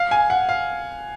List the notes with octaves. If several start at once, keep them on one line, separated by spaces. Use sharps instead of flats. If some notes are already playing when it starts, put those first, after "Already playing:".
Already playing: F5
G#5
F#5
F5